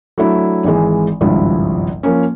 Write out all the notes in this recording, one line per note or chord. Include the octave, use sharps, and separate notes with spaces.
F#3 A3 D4 E4
G#1 E3 G#3
G#1 C#2 G2 F3 E4
F3 A#3 C#4